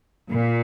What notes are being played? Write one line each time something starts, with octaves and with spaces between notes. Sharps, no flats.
A#2